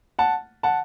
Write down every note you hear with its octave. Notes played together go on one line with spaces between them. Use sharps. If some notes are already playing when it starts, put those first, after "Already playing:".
F#5 A5
F#5 A5